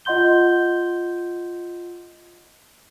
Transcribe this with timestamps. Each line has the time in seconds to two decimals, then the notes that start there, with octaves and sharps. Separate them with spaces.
0.05 F4 D#5 F#5 C6 G6 G7